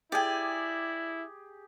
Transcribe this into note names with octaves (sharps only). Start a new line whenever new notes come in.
E4 G4 G#4 D5 G5 G#5